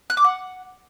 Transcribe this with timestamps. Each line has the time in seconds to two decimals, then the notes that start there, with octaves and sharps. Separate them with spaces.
0.10 F#6
0.17 D6
0.24 F#5